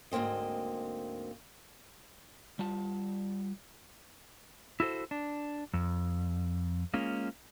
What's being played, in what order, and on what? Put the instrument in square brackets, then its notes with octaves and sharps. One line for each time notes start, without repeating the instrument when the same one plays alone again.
[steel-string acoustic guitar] D2 G#2 A#3 C4 D#5
[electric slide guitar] G3 F4 A5
E4 F#4 A4 C5
D4
F2
G#3 A#3 C#4 F4